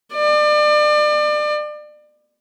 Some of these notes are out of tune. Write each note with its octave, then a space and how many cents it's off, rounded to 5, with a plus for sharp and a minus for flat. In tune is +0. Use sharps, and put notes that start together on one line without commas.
D5 +35